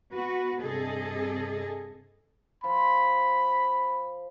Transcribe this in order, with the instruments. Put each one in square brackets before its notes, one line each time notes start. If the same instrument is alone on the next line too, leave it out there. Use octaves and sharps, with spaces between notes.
[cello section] B3 F#4 B4
G2 C3 G#4 A4 D#5
[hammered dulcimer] F3 [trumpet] B5